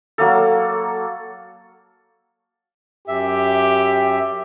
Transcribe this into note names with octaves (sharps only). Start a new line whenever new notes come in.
F#3 A#3 A4
F#2 G4 E5